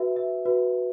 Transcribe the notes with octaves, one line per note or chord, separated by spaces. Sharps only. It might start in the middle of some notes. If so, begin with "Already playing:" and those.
Already playing: F#4 B4 E5
E5
F#4 B4